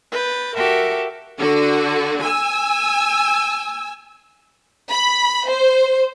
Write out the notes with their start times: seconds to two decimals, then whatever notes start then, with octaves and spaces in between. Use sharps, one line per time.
0.12 B4 G6 A6
0.55 F#4 G4 A4 A#4 E5
1.39 D3 F#4
2.22 G#5 E6
4.90 B5
5.48 C5